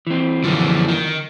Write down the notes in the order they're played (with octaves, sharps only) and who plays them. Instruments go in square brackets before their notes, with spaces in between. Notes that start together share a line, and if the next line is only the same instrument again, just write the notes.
[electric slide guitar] E3 C4
[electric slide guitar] F#2 E3 [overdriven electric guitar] D3 F3
[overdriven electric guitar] D#3